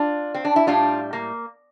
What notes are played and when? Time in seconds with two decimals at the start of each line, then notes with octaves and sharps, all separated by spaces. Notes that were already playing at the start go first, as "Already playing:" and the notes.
Already playing: D4 F4
0.34 C4
0.45 D4
0.56 E4
0.67 A2 G3 D4 F4
1.13 A#3